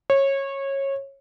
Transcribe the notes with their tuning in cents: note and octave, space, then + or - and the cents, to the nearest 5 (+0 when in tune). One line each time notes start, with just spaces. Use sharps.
C#5 -20